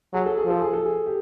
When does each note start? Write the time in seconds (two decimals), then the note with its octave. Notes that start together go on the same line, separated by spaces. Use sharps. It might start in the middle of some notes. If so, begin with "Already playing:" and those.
0.13 F#3 G#4
0.26 A4
0.38 G#4
0.45 F3
0.50 A4
0.61 G#4
0.73 A4
0.86 G#4
1.06 G4